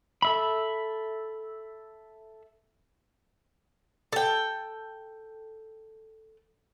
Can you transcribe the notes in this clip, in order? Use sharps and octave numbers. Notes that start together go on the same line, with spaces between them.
A4 E5 B5
A4 G5